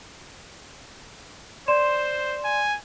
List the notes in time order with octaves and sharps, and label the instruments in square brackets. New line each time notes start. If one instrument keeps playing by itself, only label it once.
[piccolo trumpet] C5 [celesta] D5 C6 E7
[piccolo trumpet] G#5